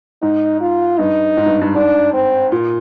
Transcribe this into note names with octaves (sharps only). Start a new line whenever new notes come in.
G#2 D#4
F4
G2 D#4
G#2
G2
G2
G#2 D4
C4
A#2